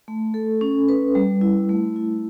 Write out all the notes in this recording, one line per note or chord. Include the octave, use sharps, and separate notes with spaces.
A3
A4
C#4
B4
G3
E4
A3
E4